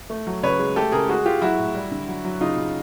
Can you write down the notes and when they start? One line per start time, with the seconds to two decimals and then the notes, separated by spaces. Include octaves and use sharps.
0.10 A3
0.27 F#3
0.43 C#3 B4 C#5
0.59 G#3
0.76 A3 G4 A4
0.92 C#3 G#4 A#4
1.09 G#3 F#4 G#4
1.25 G#3 F4 G4
1.42 F#3 E4 F#4
1.58 A2
1.75 G3
1.91 D3
2.08 F#3
2.25 F#3
2.41 C#3 D#4 F4
2.57 C#3